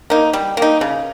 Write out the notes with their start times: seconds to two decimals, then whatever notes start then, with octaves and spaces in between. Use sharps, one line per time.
0.10 A#3 D#4
0.33 G3
0.57 A#3 D#4
0.81 C#3